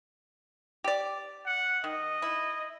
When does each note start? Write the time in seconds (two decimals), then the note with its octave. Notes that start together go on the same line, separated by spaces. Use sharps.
0.84 G4 D5
1.46 F#5
1.84 D#3 D#5
2.22 E4